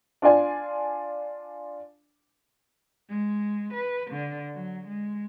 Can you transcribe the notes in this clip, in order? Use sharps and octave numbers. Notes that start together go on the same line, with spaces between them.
D4 F4 D5 G#5
G#3
B4
D3
F#3
G#3